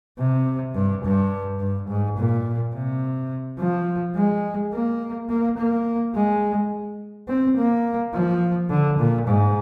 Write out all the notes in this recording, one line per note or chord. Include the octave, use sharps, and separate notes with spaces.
C3
G2
G2
G2
G#2
A#2
C3
F3
G#3
A#3
A#3
A#3
G#3
C4
A#3
F3
D3
A#2
G#2